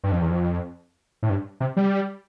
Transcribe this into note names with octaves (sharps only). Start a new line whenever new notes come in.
G2
F2
E2
F2
A2
G2
C3
G3